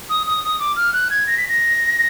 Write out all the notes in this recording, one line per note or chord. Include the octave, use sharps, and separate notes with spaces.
D#6
D#6
D#6
D6
F6
F#6
G#6
A#6
B6
A#6